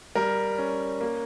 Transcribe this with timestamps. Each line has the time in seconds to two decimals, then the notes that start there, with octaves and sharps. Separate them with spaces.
0.15 G3 A#4
0.58 C#4
1.01 A#3